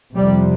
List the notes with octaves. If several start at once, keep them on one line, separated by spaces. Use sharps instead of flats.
F2 C3 G3